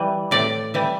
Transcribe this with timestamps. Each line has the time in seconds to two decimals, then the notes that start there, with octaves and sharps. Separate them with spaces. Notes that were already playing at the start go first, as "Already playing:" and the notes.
Already playing: E3 G3
0.31 A2 D5
0.74 E3 G3